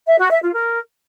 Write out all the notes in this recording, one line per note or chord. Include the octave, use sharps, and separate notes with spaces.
E5
F#4
E5
F4
A#4